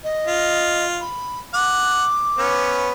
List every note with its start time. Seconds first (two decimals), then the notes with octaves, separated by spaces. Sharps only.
0.04 D#5
0.27 F4
1.01 B5
1.54 F#5 D6
2.38 B3 C#4